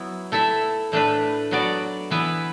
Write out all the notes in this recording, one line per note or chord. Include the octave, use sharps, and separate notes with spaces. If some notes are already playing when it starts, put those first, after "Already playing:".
Already playing: F#3 B3 E4
A3 E4 A4 E5
A2 A3 D4 B4
F#3 B3 F#4 D5
E3 B3 E4 B4